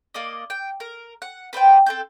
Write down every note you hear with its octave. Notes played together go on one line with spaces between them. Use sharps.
A#3 D5 D#5
G5
A#4
F#5
B4 C5 D5 G5
C4 A4 G6